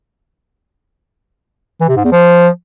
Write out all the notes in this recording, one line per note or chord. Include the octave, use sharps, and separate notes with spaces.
E3
C3
G#2
E2
F3